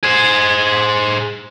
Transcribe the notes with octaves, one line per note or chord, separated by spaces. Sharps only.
G#4 C5